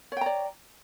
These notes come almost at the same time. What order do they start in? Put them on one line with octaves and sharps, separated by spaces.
C#5 G5 A#5 D5